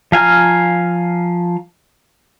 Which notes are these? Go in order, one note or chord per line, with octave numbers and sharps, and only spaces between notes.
F3 F5 G#5 A#5 F6